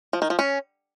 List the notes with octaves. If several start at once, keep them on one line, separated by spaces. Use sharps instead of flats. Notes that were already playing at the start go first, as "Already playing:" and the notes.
F3
D#3
F3
C#4